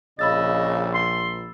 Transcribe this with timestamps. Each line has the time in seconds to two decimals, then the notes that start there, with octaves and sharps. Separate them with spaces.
0.19 A#1 C#3 D#5 B5 E6 A6
0.95 C6